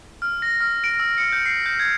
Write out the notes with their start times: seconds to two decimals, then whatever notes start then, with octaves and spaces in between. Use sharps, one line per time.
0.22 F6
0.42 A#6
0.61 F6
0.84 D7
1.00 E6
1.18 C#7
1.33 G6
1.46 C7
1.66 G6
1.80 G#6